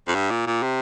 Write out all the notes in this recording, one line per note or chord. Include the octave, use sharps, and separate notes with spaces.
F2
G2
A#2
A#2
C3